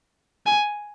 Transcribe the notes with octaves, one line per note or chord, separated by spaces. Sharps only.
G#5